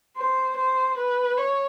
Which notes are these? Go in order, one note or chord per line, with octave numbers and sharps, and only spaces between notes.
C5
C5
B4
C#5